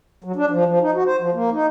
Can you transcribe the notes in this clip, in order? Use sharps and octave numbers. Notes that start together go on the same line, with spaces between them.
F#3
D4
F3
F3
D#4
F#4
C5
F3
A#3
D#4